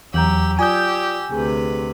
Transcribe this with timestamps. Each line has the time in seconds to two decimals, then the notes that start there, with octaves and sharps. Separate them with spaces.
0.14 E2 F#3 G4 A#5 E6 G6 F#7
0.59 F4 G4 D5 G#5 D#6 E6 G6
1.32 D2 C3 G#4 B4